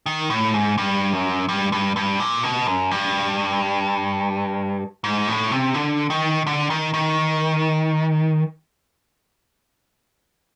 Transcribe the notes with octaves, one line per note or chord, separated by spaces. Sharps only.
D#3
A2
G#2
G2
F#2
G2
G2
G2
A#2
B2
F#2
G2
G#2
A2
C3
D3
D#3
D3
D#3
D#3